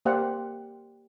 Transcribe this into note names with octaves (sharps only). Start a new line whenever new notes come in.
A#3 G4 C5 D5 F5 F#5